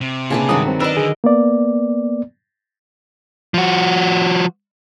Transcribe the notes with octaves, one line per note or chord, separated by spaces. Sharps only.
C3
A#2 C#3 D4 B4
G2 D#3 F#3 G#3 F#4 D#6
C4
D4 A#4 B4 D#5 E6
D3 G#4
A#3 B3 D5
F3 F#4